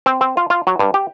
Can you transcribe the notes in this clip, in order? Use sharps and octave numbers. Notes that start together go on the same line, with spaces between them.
C4
C4
F4
F4
F#3
G2
G4